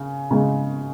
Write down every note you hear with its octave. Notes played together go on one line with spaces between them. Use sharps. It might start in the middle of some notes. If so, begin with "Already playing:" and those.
Already playing: C#3
C#3 G#3